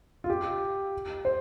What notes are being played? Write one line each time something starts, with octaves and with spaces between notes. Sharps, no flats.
F4
G4
C5